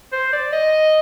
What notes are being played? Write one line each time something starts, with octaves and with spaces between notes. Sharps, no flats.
C5
D5
D#5